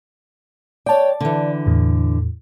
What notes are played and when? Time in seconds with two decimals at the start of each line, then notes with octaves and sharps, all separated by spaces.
0.86 C#5 D5 G5 A5
1.20 D3 E3
1.66 E2 A2